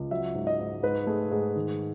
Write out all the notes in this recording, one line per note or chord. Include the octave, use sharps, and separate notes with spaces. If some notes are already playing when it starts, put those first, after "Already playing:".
Already playing: C#2
F#3 E5
G#2
D#5
G#2
G#2 B4
A3 G#4
G#2 G#4
D#3